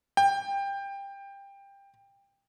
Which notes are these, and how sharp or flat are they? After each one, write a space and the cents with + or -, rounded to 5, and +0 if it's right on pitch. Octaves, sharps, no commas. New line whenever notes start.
G5 +20